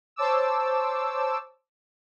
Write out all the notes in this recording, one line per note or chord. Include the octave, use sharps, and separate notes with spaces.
C5 C#5 A5 D6 E6